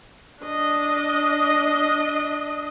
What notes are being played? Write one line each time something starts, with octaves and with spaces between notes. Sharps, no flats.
D4 D#5